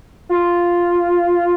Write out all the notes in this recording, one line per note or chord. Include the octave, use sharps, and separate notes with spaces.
F4